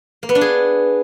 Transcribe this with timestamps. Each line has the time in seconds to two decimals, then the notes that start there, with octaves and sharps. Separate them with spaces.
0.23 A#3
0.29 B3
0.35 D4
0.41 G#4